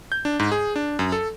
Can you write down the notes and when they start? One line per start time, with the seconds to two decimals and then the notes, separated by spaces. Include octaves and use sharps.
0.12 G6
0.25 D4
0.39 G#2
0.52 G#4
0.76 D4
0.99 F#2
1.12 A4